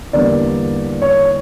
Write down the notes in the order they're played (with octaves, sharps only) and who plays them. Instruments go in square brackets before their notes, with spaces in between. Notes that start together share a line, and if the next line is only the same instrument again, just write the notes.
[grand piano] E2 D3 G3 A#3 D5
C#5